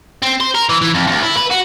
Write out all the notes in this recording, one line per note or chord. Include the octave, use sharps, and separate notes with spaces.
C4
C5
A#4
E3
E3
F2
D2
E4
B4
F#4